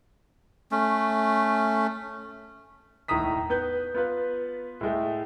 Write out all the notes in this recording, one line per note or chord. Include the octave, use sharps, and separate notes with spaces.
A3 C#4
E1 A2 D#3 A#5 D#6 B6
B3 B4 G6
B3 F4 B4
A2 G#3 A3